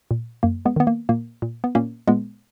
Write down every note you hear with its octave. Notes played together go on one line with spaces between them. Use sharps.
A#2
F#2 A#3
G#3 B3
D#3 B3
A#3
A#2 A#3
A#2
B3
A#2 A#3 C#4
A#2 G#3 B3